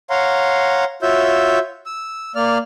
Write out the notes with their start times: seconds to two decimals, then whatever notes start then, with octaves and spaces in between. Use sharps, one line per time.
0.10 C#5 F5 F#5 A#5 C6
1.02 F4 F#4 C#5 E5 E6 G6
1.86 E6
2.36 A#3 D5 F6